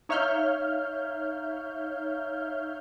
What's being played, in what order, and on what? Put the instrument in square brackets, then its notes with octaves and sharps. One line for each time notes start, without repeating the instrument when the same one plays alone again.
[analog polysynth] D#4 C#5 E5 F5 F6 G6